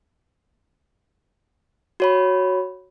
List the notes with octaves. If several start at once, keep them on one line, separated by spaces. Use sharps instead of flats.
F#4 C#5 B5